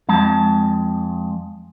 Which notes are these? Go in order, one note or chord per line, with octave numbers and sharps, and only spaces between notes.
F2 G#3 A5